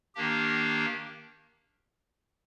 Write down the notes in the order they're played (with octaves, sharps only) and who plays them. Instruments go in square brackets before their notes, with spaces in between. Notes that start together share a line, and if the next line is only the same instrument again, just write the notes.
[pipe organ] D#3 A#3 D4 G4